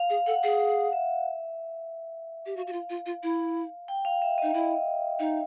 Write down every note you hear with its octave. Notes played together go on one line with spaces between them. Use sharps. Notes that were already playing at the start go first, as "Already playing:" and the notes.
Already playing: F5
G#4
A4 F#5
G#4
E5
G4
F#4 F5
F#4
F4
F4
F4
E4
G5
F5
E5
D#4 D#5
E4 D#5
D#4